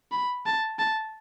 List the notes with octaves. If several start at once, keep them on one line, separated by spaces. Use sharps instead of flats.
B5
A5
A5